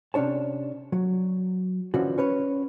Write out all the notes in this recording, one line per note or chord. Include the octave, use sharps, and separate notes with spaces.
C3 C#4 D4 C#5 A5
F#3
D3 E3 F3 C#4 F#4
C#4 B4 C#5